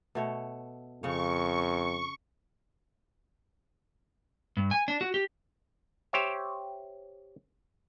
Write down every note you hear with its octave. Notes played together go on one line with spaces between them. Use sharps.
B2 A3 C#5
F2 C#3 C#5 C#6
G2
G#5
D4
F#4
G4
G4 C5 C#5 E5